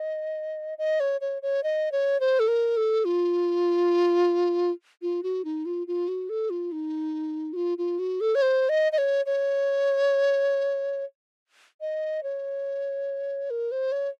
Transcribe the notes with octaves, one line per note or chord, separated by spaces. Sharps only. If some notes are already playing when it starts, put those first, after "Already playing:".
Already playing: D#5
D#5
C#5
C#5
C#5
D#5
C#5
C5
A4
A#4
A4
F4
F4
F#4
D#4
F4
F4
F#4
A4
F4
D#4
F#4
F4
F4
F#4
A4
C#5
C5
D#5
D#5
C#5
C#5
D#5
C#5
A#4
C5
C#5